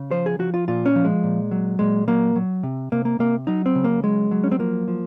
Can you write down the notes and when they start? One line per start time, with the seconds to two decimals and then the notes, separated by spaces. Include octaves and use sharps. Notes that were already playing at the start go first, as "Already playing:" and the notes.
Already playing: C#3
0.11 F3 C5
0.26 G#4
0.39 F3 F#4
0.54 F4
0.68 A#2 F4
0.86 C#4
0.96 F3
1.05 G#3
1.23 A#2
1.51 F#3
1.79 A#2 G#3
2.08 F#3 A#3
2.36 F#3
2.63 C3
2.92 C3 A#3
3.05 A#3
3.19 C3 A#3
3.47 F#3 D#4
3.66 C4
3.75 C#3
3.84 A#3
4.03 F#3 G#3
4.31 F#3
4.44 C#4
4.52 C4
4.59 F3 A#3
4.88 F3